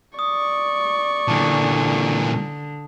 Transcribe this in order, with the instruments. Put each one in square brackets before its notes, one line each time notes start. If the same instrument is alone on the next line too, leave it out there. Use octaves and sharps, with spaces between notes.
[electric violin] D5 C#6 [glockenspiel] D#6
[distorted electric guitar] A#2 E3 [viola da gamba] D3 [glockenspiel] A5